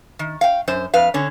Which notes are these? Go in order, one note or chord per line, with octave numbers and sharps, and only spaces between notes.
D#3
F5 G5
F#2 C5
F2 B4 F5
D3 C#4